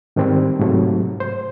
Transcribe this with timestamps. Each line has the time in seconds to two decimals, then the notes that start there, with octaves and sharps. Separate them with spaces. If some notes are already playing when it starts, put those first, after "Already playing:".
0.16 G#2 D#3 G3 C4
0.60 G#2 C3 F#3 A3
1.20 C5